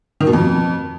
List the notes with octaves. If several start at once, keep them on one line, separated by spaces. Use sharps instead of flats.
D#3
B2
F2